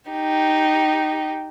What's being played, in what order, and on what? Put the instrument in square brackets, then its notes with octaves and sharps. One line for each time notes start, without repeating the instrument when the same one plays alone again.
[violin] D#4 G4